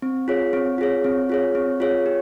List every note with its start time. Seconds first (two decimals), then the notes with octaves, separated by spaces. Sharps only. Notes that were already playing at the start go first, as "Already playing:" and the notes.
0.02 C4
0.28 F4 G#4 C#5
0.53 C4
0.78 F4 G#4 C#5
1.04 C4
1.29 F4 G#4 C#5
1.55 C4
1.80 F4 G#4 C#5
2.06 G4